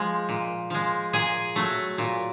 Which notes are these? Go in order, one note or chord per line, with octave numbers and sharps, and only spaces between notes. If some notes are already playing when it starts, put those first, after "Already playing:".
Already playing: F3 G#3
A#2
F3 G#3
A#2 G#4
F#3 A3
A#2